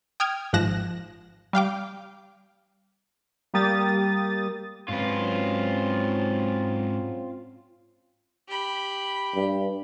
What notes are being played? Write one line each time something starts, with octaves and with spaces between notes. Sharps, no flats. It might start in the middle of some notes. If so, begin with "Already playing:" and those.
G5 D#6 F6 G#6
G#1 G#2 F3 F#6 A#6 E7
G3 F5 G5 D6
G3 A#3 G4 D#6 A6
G#2 F#3 C4 C#4 F4 B4
G4 B5
G2